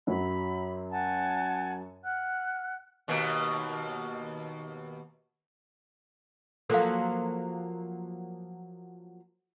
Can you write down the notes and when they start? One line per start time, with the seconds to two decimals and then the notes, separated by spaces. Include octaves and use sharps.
0.07 F#2 F#3 B5
0.91 F#5 G#5 A5
2.05 F#5 F6 F#6
3.08 D#2 B2 A#3
6.70 F3 F#3 A#3 A4 F5